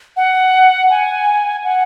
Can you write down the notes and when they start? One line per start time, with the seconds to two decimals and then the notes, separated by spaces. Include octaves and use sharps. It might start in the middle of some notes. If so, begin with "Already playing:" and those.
0.17 F#5
0.90 G#5
1.64 F#5